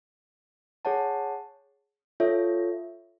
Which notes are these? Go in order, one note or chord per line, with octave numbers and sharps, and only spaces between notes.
G#4 C#5 F#5 A5
F4 A4 C#5 E5